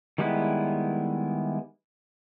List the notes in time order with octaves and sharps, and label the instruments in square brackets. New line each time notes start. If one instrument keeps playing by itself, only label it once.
[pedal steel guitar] D#3 G3 G#3 B3 E4